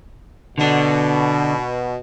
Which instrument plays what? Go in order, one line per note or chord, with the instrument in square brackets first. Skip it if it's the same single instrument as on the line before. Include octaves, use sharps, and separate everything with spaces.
[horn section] B2 [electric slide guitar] D3 D4